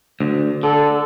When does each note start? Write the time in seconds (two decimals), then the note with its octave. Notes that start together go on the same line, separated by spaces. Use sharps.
0.20 D2
0.63 D3 A4